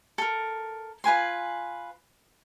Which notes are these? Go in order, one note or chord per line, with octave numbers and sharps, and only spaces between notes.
A4 A#4
F4 B4 G#5 C6